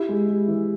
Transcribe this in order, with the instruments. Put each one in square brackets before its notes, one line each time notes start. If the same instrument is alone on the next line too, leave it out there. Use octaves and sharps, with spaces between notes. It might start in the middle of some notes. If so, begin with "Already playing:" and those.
Already playing: [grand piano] E4 [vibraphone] G4
[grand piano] G#3
G#3
E3